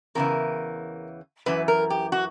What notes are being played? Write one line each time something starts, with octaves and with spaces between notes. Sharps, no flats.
E2 C#3 E3 A#4
F#2 E3 B4
A#4
G4
F#4